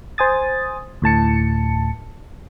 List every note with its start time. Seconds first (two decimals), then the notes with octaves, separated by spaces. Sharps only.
0.18 C5 G#5 D#6 A6
1.02 D2 A2 A5 C#7